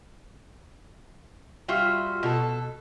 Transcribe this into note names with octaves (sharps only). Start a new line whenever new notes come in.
G3 F4 F#4 E5
B2 A4